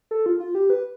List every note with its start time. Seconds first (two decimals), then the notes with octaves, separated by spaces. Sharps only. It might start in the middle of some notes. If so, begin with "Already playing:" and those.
0.11 A4
0.26 F4
0.40 F4
0.55 G4
0.70 B4